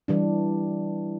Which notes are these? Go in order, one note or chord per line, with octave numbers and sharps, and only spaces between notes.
E3 G3 D4